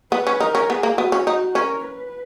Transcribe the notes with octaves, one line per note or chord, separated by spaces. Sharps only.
B3 B4
C#4
D#4 A#4
C#4
B3 G#4
A#3
B3 F#4
C#4
D#4 F#4
C#4 A#4
B4